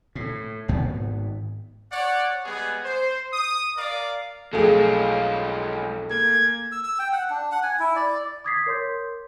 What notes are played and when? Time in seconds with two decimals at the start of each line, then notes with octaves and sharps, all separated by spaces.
0.15 A2
0.68 G#1 G#2 B3
1.92 C#5 D5 F#5
2.44 G3 G#3 B3 G#4
2.84 C5
3.32 D#6
3.77 A#4 D5 F5 D6
4.53 B1 F2 G#3 A3 F4 G#4 F5
6.11 A#3 G#6
6.72 E6
6.84 E6
6.99 G5
7.12 F#5
7.30 D4
7.52 F#5
7.63 G#5
7.79 E4
7.96 D5
8.44 D6 D#6 G#6 A6 B6 C7
8.66 A#4 C#5 C6 G6